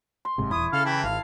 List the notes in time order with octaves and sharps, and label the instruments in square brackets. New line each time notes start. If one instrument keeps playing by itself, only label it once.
[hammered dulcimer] C6
[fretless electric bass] F#1 G#2 C3
[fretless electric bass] D#1 E2 [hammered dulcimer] E4 C#6 [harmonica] D#6
[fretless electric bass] C#3 [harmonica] A4 F5 F6
[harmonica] E3 E4 G5 [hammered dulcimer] A4
[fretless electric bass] G#1 [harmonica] F5